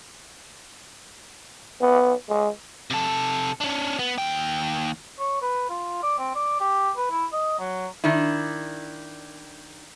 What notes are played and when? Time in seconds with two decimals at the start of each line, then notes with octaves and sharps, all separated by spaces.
1.81 B3
2.29 G#3
2.90 C3 A4
3.61 C#4 D4
3.99 B3
4.18 D#2 G5
5.19 C#5
5.42 B4
5.69 F4
6.03 D5
6.18 C4
6.35 D5
6.60 G4
6.97 B4
7.11 E4
7.33 D#5
7.60 F#3
8.04 D#3 D4 E4